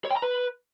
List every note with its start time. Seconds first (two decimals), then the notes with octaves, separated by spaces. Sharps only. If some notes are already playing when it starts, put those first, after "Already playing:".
0.05 C#5
0.11 G5
0.16 A#5
0.22 B4